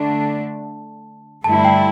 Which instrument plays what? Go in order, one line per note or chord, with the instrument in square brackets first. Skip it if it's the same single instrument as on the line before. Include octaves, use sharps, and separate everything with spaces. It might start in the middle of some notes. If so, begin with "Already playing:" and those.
Already playing: [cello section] D3 A3 D4 [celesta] A5
[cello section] G2 D3 A3 E4 [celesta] A5
[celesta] G5